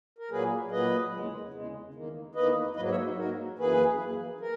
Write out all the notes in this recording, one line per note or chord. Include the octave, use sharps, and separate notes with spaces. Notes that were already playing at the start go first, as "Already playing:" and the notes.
A#4
A#2 F#3 A#3 G#4 B4
A#2 F#3 A#3 B4 D#5
E2 C#3 G#3
E2 C#3 G#3
E2 D#3 A#3
E2 D#3 A#3 B4 D#5
G#2 F#3 A#3 B4 D#5
C#5 E5
D#4 F#4
G#2 F#3 A#3 F#4 A#4
F#2 E3 A#3 G#4 B4
F#2 E3 A#3
A#4